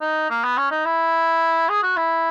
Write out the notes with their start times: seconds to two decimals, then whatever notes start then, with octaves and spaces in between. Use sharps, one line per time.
0.01 D#4
0.30 A#3
0.44 B3
0.57 C#4
0.71 D#4
0.85 E4
1.69 G#4
1.83 F#4
1.97 E4